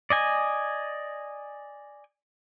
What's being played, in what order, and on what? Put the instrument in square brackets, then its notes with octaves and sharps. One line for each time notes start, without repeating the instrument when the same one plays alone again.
[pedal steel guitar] D5 D#5 G#5